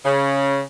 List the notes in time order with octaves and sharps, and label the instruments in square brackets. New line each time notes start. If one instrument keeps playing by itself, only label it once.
[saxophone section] C#3